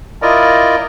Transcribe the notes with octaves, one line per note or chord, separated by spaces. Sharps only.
E4 F4 A#4 D5 D#5